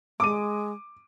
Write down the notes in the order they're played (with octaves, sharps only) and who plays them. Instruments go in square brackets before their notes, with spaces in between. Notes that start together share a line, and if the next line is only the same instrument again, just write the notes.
[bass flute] G#3 [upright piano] D6 D#7